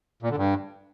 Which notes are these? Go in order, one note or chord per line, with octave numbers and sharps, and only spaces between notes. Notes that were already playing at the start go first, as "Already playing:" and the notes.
A#2
D3
G2